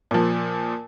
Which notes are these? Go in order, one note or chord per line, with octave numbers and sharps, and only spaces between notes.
A#2 F3